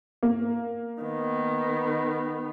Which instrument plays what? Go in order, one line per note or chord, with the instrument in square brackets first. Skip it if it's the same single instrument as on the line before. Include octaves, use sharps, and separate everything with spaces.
[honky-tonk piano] A#3
[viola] D#3 B3